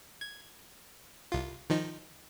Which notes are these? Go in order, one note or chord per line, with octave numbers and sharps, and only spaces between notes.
G#6
C2 F4
D#3 F3 D#4